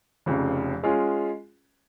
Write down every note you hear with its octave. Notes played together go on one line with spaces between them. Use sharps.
F1 F2 C#3
G#3 C#4 F4 G#4